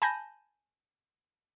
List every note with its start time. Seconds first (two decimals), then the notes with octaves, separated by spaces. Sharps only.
0.02 G#5 A5 B5 G6 A#6